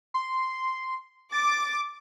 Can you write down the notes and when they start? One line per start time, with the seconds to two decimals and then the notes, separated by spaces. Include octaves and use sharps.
0.14 C6
1.32 D6 A6